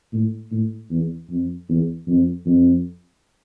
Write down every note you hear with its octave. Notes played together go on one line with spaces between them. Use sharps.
A2
A2
E2
F2
E2
F2
F2